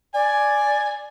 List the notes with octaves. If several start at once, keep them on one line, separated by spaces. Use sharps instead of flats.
D5 G#5